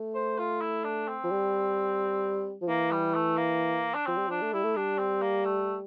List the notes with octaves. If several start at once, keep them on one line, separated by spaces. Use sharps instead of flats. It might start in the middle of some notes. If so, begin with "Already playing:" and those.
Already playing: A3
C5
F4
E4
D4
C4
F3
G3
F3
E3 A#3
G3
A3
A#3
D4
F3 C4
G3
F3 D4
A3
G3 E4
A3
G3 D4
C4
A#3
A3